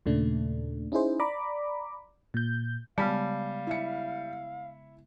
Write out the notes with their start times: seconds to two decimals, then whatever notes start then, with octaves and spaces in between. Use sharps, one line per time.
0.06 D#2 A#2 C#3 A3 D4
0.92 C#4 D#4 E4 G#4 C5
1.20 D5 A#5 B5 D6
2.34 A#2 G6
2.98 C#3 G3 G#3 B3 F5 A5
3.67 E4 E5 C#7